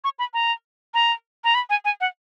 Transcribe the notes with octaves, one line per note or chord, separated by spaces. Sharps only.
C#6
B5
A#5
A#5
A#5
B5
G#5
G#5
F#5